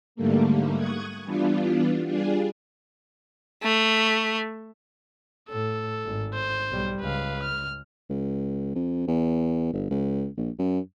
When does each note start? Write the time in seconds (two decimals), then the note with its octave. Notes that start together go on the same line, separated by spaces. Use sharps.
0.15 G#2 D3 G3 A3 A#3
0.75 C#6 D#6 F#6 G#6
1.24 E3 G3 B3 D4 F4
2.05 G3 D4 F4 G#4
3.63 A3
5.49 A2 A4
6.04 G#1
6.34 C5
6.70 B1 G3
7.00 C#2 B4 F5
7.43 F6
8.10 C#2
8.75 F2
9.08 E2
9.74 G1
9.91 C#2
10.37 A#1
10.59 F#2